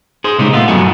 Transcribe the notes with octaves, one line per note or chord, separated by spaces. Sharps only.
G#4 C5
A#2 C#3 G3 G#3 D#4
A3 B3 F4
G2 F#3 E4 F#4 A4 G#5